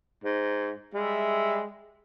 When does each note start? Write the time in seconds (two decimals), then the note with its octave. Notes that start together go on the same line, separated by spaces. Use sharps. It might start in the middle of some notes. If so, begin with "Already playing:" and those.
0.24 G#2
0.94 G3 G#3 E5